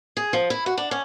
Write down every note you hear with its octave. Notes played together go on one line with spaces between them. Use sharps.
G#4
F3
E4
F#4
D4
C#4